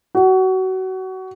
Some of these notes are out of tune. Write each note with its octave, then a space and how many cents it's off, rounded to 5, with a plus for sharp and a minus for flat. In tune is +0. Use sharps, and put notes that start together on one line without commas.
F#4 +25